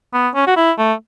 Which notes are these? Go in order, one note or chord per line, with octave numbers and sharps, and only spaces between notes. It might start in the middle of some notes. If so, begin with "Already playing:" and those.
B3
C#4
F#4
E4
A3